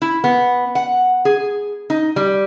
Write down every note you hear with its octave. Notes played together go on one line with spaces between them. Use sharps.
E4
B3
F#5
G#4
D#4
G3